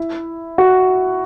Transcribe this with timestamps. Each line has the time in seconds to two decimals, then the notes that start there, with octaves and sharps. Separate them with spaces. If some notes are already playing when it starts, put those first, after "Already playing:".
Already playing: E4
0.58 F#4